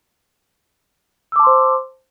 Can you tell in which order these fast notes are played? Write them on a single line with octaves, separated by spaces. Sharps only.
E6 D6 A5 C6 C5